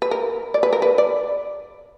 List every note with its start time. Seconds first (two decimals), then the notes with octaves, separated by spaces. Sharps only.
0.02 B4
0.11 A#4
0.54 D5
0.63 B4
0.73 A#4
0.82 B4
0.98 D5